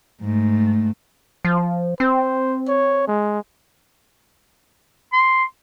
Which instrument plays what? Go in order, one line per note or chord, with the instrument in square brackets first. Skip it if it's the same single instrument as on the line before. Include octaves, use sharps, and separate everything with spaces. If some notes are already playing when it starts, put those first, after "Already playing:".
[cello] G#2 A3
[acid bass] F3
[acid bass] C4 [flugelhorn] C5
[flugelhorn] C#5
G#3
[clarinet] C6